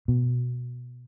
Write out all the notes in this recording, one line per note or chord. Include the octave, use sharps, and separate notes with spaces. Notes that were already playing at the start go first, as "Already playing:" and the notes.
B2